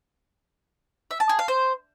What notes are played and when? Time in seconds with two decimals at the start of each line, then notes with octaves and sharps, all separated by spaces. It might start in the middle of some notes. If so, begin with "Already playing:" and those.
1.11 E5
1.20 A5
1.29 G#4
1.39 F5
1.48 C5